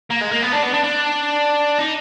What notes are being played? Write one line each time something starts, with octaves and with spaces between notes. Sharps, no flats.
A#3
G#3
A#3
B3
D4
B3
D4
D4
D#4